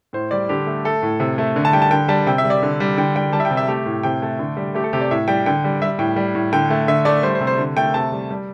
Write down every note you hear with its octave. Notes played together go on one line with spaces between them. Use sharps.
A2 C5
G3 D5
D3 G4
A3
A3 A4
A2
C3
A3
D3
A5
G3 G5
A5
D3 G5
G3 A5
C3 G5
E5
G3
D5
D3
G3
D3 G5
G3 G5
G3 A5
E5
G5
C3
E5
A3 G4
A2
C3 G5
A3
D3
G3
A3 G4
A4
C3 G4
D5
A2 E5
G3 G5
D3 G5
G3
G3 E5
A2 G5
G3
A2
D3 G5
A3
D3 E5
A3 D5
G3 C5
C5
C3
C5
D3
A3 G5
C3 A5
G3
G3